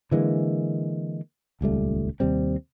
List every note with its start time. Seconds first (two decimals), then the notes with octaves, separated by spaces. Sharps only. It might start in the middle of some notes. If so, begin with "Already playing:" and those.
0.11 D3 E3 G#3 A#3
1.61 D#1 C#2 G3 A3
2.20 D#2 C3 G3 C4